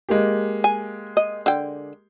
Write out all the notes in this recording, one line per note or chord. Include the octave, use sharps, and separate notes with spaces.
G#3 A#3 G4
G#5
D#5
D3 G5